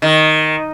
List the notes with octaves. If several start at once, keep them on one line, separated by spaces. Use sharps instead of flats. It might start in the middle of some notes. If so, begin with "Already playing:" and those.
D#3